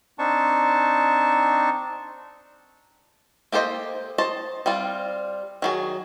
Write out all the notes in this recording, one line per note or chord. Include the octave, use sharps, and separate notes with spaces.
C4 D4 D#4 A5 C#6
A#3 G4 A4 C5 D#5
C5 D#5 A5
G3 C4 F4
D#3 F#3 G#4